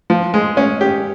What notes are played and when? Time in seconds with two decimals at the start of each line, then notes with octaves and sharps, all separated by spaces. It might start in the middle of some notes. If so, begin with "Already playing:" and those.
0.10 F3
0.34 G#3
0.57 C#4
0.81 G4